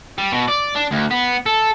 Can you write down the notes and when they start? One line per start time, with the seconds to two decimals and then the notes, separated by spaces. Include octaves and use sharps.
0.18 G3
0.32 B2
0.48 D5
0.75 D4
0.91 D2
1.11 B3
1.46 A4